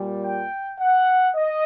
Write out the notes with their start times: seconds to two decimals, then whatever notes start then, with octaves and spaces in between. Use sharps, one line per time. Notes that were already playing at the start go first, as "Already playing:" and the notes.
Already playing: A#2 G3
0.23 G5
0.79 F#5
1.35 D#5